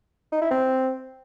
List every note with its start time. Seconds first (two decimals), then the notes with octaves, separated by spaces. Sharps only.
0.32 D#4
0.41 E4
0.51 C4